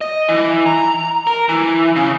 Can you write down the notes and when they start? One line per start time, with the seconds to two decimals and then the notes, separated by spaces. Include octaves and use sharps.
0.01 D#5
0.29 E3
0.66 A#5
1.27 A#4
1.49 E3
1.96 C#3